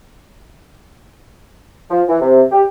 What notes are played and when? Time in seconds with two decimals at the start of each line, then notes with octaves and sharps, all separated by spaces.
1.91 F3
2.08 E3
2.21 C3
2.52 G4